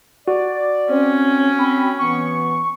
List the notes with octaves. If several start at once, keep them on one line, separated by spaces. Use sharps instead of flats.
F#4 D5
C4 C#4
C4 B5
B2 E3 B3 C#6